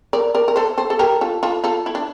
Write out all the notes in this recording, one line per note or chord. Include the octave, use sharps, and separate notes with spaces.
A#4 D5
A#4 D5
A#4
A4 C5
A4 C5
A4
G4 A#4
F4 A4
F4 A4
F4 A4
E4
D4